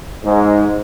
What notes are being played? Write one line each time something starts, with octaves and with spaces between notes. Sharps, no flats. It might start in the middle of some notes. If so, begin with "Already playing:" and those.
G#2